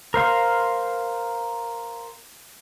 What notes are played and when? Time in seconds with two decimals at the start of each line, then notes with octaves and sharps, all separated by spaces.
0.14 A#4 C5 F5 C6